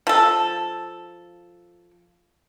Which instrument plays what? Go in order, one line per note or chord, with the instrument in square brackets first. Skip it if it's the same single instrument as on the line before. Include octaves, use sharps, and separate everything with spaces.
[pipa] F3 A4